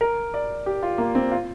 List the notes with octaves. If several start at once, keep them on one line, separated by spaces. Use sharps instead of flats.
A#4
D5
G4
F4
A#3
C4
F4